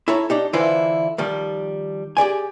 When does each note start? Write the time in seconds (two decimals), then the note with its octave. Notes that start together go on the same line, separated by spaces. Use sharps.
0.08 E4 A4 C#5 A#5
0.30 D4 D#4 G4
0.53 D3 E3 E4 F4 B4 C5
1.18 D#3 F3 G3
2.17 G4 G#4 D5 G#5